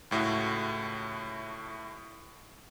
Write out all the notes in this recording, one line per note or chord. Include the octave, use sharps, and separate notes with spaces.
C#2 A2 A3 F#4